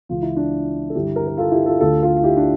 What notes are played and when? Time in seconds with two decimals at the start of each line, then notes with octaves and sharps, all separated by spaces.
0.09 C#2 C#3 E3 F4
0.22 E4
0.36 D4 F4
0.90 A4
0.95 G2 D3 E4 G4
1.16 G4 A#4
1.27 A#4
1.37 F4 A4
1.52 E4 G4
1.66 F4 A4
1.80 D2 D3 F4 A4
2.03 F4 A4
2.16 F4
2.24 E4 G4
2.37 D4